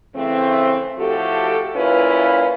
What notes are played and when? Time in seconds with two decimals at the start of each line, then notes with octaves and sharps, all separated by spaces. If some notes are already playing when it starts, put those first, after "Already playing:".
0.16 C#3 E3 A3 C4
0.98 A2 F3 F#4 G4 A4
1.76 A#2 C#4 E4 F4 B4